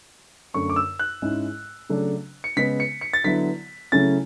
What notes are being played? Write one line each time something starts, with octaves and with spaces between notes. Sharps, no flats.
F#2 D3 A3 C#6
D6
E6
F#6
G#2 G#3 C#4 E4
C#3 F#3 A3 D4
C#7
C#3 G#3 B3 B6
C#7
C#7
A6
D3 F#3 B3 E4 B6
C#3 F#3 A3 C#4 E4 A6